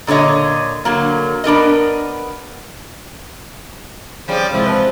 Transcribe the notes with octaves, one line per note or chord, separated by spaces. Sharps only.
A#2 D3 F4 C#5 D#5
D3 F#3 A#3
B3 D4 A#4 D#5
C#3 F3 G3 C4
C3 F3 G#3 C4 E4
B4 C5 A5